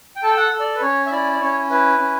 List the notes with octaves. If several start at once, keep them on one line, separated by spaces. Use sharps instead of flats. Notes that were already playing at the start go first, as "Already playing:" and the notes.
G5
A4 A5
G5
F#5
A4
D5
B4
C#4 C#5
E5
E4 D5
D5
C#4 C#5
E4 B4
C#4